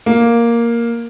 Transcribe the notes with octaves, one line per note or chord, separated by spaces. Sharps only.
A#3